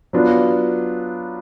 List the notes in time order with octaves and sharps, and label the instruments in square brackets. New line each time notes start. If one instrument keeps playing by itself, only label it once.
[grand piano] F#3 B3 D4 F4